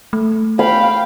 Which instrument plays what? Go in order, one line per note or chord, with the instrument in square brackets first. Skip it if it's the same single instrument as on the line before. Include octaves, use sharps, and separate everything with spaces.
[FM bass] A3
[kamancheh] F5 G5 [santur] B5